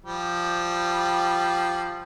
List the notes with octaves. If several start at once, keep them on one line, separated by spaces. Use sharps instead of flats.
F3 G3